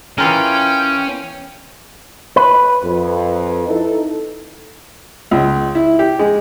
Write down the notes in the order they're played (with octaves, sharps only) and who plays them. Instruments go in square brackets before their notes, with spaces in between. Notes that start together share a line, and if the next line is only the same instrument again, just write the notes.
[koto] E3 F4 A#4 [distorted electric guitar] C#4 [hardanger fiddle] G5
[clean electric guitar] B4
[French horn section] F2
D#4 E4 A4
[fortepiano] C#2
E4
G4
G#3